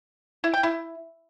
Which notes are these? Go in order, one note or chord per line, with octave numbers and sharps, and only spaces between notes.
E4
G5
E4